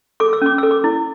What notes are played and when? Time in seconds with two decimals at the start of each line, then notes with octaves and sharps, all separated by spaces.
0.20 A4 D6
0.33 E6
0.42 C#4 D6
0.58 A4 E6
0.71 D6
0.84 E4